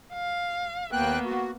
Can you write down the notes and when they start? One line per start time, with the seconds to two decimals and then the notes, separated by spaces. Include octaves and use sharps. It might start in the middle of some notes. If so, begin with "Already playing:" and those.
0.14 F5
0.92 D#2 A#3 B3 G5 F#6
1.25 F#4